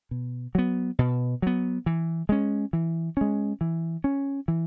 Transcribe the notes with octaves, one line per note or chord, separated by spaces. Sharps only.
B2
F#3 B3
B2
F#3 B3
E3
G#3 C#4
E3
G#3 C#4
E3
C#4
E3